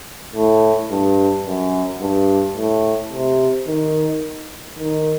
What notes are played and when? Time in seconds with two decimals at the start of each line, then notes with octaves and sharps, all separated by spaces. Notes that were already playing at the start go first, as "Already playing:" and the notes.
0.35 A2
0.91 G2
1.46 F#2
2.01 G2
2.57 A2
3.12 C3
3.68 D#3
4.79 D#3